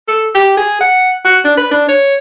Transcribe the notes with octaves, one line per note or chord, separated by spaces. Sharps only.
A4
G4
G#4
F#5
F#4
D4
B4
D4
C#5